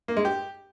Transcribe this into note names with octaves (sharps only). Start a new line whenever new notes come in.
A#3
G#3
G4